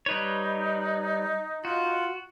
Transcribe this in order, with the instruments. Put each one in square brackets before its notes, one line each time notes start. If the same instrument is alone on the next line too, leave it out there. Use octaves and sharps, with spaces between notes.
[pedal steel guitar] G3 B4 C#5 [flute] D#4
[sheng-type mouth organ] F4 [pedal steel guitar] F#4